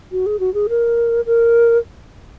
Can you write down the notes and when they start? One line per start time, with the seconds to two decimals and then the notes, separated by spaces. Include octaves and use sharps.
0.12 F#4
0.26 G#4
0.40 F#4
0.54 G#4
0.69 A#4
1.26 A#4